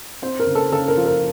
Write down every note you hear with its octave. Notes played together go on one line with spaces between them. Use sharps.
C4 C5
A#4
C#3
A4
C#3 A4
A#4
F3
A#4